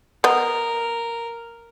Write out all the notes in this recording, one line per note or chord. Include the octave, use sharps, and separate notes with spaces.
B3 A#4 D#5